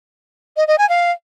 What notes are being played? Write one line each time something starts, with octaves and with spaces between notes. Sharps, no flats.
D#5
D#5
G#5
F5